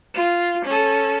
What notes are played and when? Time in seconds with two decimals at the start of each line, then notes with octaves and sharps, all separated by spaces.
0.15 F4
0.65 C#4 A4